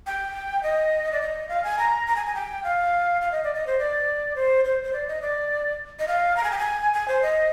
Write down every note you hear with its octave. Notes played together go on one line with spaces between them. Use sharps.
G5
D#5
D5
D#5
F5
G#5
A#5
A#5
G#5
G#5
G5
F5
F5
D#5
D5
D#5
C5
D5
C5
C5
C5
D5
D#5
D5
D#5
F5
A#5
G#5
G5
G#5
G#5
C5
D#5